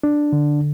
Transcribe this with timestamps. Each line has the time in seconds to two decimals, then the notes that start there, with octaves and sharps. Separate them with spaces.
0.03 D4
0.32 D3